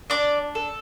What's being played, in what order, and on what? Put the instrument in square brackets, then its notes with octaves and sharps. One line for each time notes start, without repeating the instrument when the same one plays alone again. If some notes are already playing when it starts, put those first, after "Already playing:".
[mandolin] D4 D5
A4